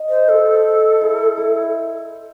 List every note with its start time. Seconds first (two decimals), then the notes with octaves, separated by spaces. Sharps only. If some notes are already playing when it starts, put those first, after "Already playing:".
Already playing: D#5
0.09 C5
0.28 A4 C5
1.01 E4
1.37 E4